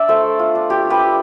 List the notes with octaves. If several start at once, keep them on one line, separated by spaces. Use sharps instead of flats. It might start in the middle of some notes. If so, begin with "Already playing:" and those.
Already playing: D4 D5 E5
A3 A4 C5
A3
F4
D4
F4 G4
D4
G4 B4
D4